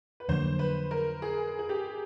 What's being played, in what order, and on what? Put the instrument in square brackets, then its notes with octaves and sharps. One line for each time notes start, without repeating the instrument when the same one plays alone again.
[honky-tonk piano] B4
[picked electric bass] F2 D3 F#3 A#3 [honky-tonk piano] C5
[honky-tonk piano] B4
A#4
G#4
G#4
G4